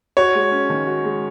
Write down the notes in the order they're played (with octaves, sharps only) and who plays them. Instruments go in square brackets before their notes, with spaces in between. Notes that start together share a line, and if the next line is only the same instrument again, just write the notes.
[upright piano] F#4 [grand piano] C#5
[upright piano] G#3
C#4
D#3
F#4
G#3